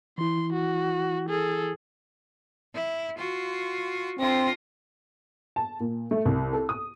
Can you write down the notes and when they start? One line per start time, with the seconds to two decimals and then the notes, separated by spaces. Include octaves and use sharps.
0.18 E3 E4 C6
0.53 F#4
1.29 G#4 A4
2.74 E4
3.17 F4 F#4
4.19 D3 C4 F4 A#6
5.56 A5
5.80 A#2
6.11 A3
6.25 C2
6.53 A4
6.69 D#6